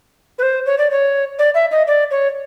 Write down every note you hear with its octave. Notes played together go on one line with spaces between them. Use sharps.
B4
C5
C#5
D5
C#5
D5
E5
D#5
D5
C#5